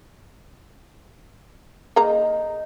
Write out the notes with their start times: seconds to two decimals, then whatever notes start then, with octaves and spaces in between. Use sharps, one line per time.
1.96 A#3 D#4 G#4 A#5